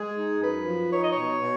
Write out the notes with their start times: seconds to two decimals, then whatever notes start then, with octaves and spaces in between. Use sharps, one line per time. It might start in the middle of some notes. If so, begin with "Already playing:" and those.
Already playing: G#3 G#4
0.16 D#4
0.40 F#2 B4
0.66 F3
0.91 D#4 C#5
1.02 D#5
1.11 C#5
1.17 B2
1.42 B2